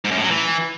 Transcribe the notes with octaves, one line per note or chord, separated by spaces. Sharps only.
G#2
F#2
A2
F#3
E3